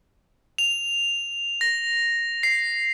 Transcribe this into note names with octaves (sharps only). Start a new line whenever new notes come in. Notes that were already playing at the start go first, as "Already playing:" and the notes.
F7
A#6
C7